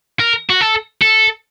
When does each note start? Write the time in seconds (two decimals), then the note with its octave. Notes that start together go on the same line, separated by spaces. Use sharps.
0.20 A#4
0.50 F#4
0.61 A4
1.01 A4